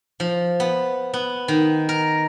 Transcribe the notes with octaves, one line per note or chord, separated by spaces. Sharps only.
F3
B3
B3
D#3
A#4